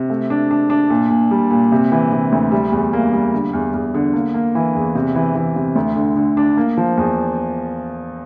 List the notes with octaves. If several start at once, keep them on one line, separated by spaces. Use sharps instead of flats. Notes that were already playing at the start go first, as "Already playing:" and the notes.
Already playing: C3
A3
D4
D4
D4
A#2
A#2
G3
A#2
C3
E3
C3
D2
G3
E2
A#3
G3
D3
E2
E2
D3
A#3
A#3
E3
E2
C3
E3
E3
C3
D2
D3
D3
D4
A#3
F3
E2